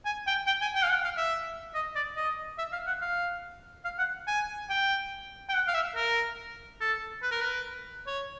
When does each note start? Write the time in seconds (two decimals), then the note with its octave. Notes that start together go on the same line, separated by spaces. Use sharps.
0.05 G#5
0.27 G5
0.47 G5
0.62 G#5
0.75 G5
0.83 F5
0.90 F#5
1.04 F5
1.17 E5
1.75 D#5
1.96 D5
2.16 D#5
2.58 E5
2.72 F5
2.87 F#5
3.01 F5
3.84 F5
3.98 F#5
4.27 G#5
4.70 G5
5.49 G5
5.54 F#5
5.67 F5
5.74 E5
5.95 A#4
6.81 A4
7.23 B4
7.31 A#4
7.41 B4
8.07 C#5